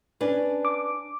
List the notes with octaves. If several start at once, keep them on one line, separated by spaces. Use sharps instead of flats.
C#4 D4 B4
D6